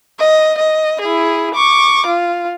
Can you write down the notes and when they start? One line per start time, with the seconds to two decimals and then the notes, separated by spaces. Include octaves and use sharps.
0.19 D#5
0.58 D#5
1.01 E4 G#4
1.55 C#6 D6
2.06 F4